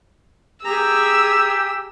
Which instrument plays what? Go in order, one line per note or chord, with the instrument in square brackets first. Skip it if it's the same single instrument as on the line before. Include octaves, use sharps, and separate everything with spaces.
[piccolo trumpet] G4 [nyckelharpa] G#4 A#5 [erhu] E6